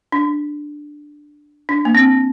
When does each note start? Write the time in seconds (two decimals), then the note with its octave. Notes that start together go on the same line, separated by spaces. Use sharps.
0.12 D4
1.69 D4
1.85 A#3
1.95 C4